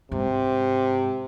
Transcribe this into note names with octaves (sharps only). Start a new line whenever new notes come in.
G#2 C3